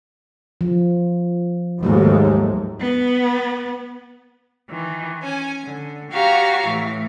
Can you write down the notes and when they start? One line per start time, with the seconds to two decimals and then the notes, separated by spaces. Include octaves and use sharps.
0.61 F3
1.83 D#2 G#2 F#3 G#3 A3
2.80 B3
4.66 D#3 E3
5.21 C#4 G#5
5.63 D3
6.10 F#4 G4 C#5 F5 A#5
6.64 A2 E3